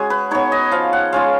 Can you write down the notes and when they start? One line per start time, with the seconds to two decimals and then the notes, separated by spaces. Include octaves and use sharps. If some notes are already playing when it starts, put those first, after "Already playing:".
Already playing: G#3 C#4 F#4 G#4
0.10 B4
0.31 B3 D#4 C#5
0.52 D#5
0.71 F3 F5
0.93 F#5
1.13 G#3 C#4 F4 F5